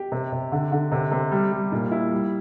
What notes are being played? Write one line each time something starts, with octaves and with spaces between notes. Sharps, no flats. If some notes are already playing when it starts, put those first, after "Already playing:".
Already playing: G4
C3
C3
D3
D3
C3
C3
G3
G3
A#2
E4
G3